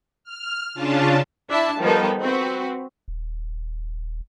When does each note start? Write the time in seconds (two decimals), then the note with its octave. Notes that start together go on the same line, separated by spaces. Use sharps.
0.24 F6
0.74 C#3 C#4 D4 F4 A5
1.49 D4 E4 E5 A5 B5
1.79 D#3 F3 G3 B3 D#4 A4
2.23 C4 F#4 B4
3.08 D#1